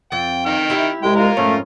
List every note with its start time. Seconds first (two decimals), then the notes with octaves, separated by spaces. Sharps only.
0.12 F2 G5
0.46 D#3 G5 F6
0.70 E4 G4 E5
1.03 C2 C3 G#3 G5
1.16 F4 A#4
1.37 F2 G#2 A3 C#4